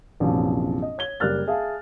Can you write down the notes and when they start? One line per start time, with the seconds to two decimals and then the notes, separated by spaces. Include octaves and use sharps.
0.20 A#1 F#2 C3 E3 F3
0.82 D#5
0.98 C#5 G#6 G7
1.20 F#1 G3 A#4 F6 F#6 A6
1.48 G#4 E5 F5 A5